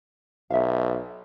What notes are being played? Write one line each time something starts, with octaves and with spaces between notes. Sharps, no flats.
B1 E5 F5